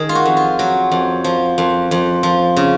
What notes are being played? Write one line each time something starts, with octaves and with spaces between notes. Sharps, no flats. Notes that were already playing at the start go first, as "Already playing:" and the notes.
Already playing: D#3 G#4
F4
F#4
F2
F4
F#3 F#4
F2
F3
F2
F2
F3
C#3